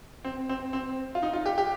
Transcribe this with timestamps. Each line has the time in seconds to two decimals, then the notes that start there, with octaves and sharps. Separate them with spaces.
0.24 C4
0.49 C4
0.73 C4
1.15 F4
1.22 D#4
1.33 F4
1.46 G4
1.58 G4